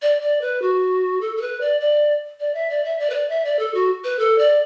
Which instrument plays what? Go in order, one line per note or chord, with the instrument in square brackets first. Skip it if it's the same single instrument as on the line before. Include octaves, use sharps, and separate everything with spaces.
[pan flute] D5
D5
B4
F#4
A4
A4
B4
D5
D5
D5
E5
D5
E5
D5
B4
D5
E5
D5
A4
F#4
B4
A4
D5